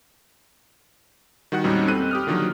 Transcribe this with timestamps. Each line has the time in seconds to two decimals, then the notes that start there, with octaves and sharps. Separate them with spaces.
1.52 D#3 G3 F#4 F#5 F#6
1.64 F2 A#2 G3 G#3 C#4 D#4
1.88 C4 A4 B5 F#6 D#7
2.11 G4 D#6 F6
2.27 D3 D#3 F3 F#3 A#3